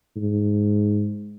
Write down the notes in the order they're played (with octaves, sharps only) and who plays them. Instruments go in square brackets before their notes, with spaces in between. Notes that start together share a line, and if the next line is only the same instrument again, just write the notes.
[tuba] G#2